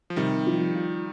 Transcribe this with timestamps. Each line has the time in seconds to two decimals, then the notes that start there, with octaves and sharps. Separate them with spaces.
0.10 F3
0.16 C3 D#3 G3
0.47 F3
0.75 F4